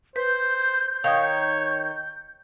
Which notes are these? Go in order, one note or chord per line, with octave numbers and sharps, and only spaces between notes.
B4 C5 G6
D#3 C#5 F5 D#6